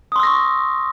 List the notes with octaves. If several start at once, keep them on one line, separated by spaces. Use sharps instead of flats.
C6 C#6 D#6 E6 A#6